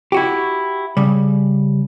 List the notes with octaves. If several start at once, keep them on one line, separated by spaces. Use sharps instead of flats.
E4 F#4 G4
C#3 G3